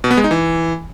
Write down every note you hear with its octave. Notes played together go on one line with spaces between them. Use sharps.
B2
B3
G#3
D#4
E3